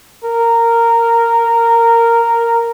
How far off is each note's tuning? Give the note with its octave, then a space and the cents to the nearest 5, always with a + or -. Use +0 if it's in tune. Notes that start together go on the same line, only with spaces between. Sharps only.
A#4 -10